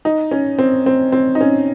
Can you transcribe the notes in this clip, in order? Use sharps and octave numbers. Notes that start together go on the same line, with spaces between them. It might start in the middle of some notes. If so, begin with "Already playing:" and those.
D#4
C#4
C4
C4
C4
D#4
C#4